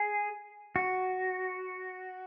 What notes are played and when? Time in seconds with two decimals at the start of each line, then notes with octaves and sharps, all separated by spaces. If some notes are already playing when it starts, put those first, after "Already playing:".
Already playing: G#4
0.76 F#4